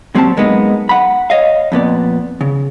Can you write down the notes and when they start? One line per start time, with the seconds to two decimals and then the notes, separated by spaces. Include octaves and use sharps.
0.15 A#2 F#3 C4 C#4 G4 A5
0.37 F#2 G#3 A#3 B3 D#4
0.89 F#5 B5
1.30 C#5 D#5 F5
1.72 F2 A#2 B3 D5
2.41 C#3